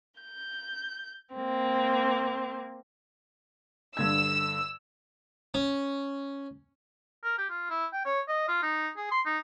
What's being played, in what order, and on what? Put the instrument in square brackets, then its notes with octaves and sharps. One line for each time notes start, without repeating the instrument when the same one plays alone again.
[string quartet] G6
A#3 C4
[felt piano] G2 D3 G#6 [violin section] E6
[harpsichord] C#4
[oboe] A#4
G4
F4
E4
G5
C#5
D#5
F4
D#4
G#4
C6
D#4